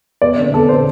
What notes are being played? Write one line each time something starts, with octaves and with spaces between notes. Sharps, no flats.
E2 D5
D3 C4
E2 A4
D3 C4 C5